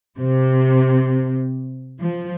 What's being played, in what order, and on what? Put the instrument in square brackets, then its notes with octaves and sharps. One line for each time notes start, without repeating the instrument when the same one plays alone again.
[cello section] C3
F3